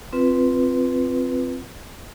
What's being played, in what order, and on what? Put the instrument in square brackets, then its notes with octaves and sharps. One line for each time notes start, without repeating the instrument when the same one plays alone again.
[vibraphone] C4 F4 B4